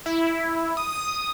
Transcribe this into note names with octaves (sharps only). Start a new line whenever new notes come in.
E4
D#6